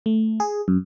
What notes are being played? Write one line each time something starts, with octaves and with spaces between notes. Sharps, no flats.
A3
G#4
F#2